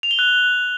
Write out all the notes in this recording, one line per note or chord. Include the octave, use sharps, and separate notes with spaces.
F7
G7
F#6